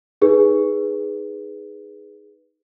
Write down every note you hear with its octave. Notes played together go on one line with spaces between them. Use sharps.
D#4 G#4 B4